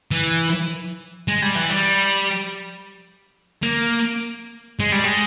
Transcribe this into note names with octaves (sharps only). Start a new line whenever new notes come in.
E3
G#3
G3
E3
G3
A#3
G#3
G3
G#3